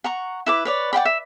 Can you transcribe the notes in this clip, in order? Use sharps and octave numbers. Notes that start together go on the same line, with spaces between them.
F#5 A#5 C#6
E4 B4 D6
B4 C#5 D5
D5 F#5 G5 B5
E5